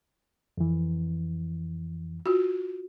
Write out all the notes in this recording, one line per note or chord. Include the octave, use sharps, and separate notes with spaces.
F2 E3
F4 F#4